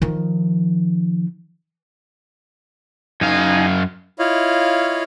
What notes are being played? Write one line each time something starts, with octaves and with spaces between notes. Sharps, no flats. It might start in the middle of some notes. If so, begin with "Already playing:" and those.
D#3 F3
F#2 D#4 F5 G#5
E4 F4 C#5 D#5 F5